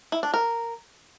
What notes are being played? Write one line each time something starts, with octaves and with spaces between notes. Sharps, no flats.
E4
D4
A#4